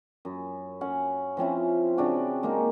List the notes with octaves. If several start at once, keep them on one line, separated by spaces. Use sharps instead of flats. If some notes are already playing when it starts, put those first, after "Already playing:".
F#2
C#4 F#5
F3 C4 C#4 E4
C#3 C4 D4 F#4
G#3 A#3 D#4 A#4